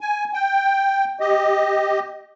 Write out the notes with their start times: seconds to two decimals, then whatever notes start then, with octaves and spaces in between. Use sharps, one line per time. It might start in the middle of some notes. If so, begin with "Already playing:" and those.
0.01 G#5
0.33 G5
1.20 G4 D#5